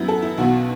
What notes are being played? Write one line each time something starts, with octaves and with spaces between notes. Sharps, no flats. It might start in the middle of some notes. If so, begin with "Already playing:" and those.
Already playing: F#2 F#3 B3 E4
A4
E4
B1 B2 B3 F#4